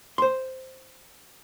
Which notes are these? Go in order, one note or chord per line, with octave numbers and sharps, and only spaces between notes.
C5 C6